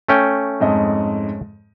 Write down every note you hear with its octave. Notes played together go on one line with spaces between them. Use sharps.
A3 C#4 G5
F2 G#2 D#5